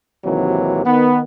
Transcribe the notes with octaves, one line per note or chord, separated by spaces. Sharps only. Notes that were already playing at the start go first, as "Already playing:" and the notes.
G#1 D#2 C3 E3 F#3
D#3 B3